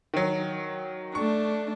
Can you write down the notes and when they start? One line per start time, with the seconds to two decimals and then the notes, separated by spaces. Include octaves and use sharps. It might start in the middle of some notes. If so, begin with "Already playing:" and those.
0.14 D#3 F#3
1.15 A3 D4 C#6